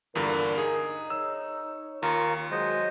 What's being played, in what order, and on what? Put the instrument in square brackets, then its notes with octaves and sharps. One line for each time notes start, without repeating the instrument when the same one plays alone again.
[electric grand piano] E2 G2 D3 [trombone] A#2 [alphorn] A#4
[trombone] D#4 [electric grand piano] G#4
[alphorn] C#5 [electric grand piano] E6
[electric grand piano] D#2 [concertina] F4 A#4 C#6
[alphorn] F#3 [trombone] G#3 [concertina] C5 D#5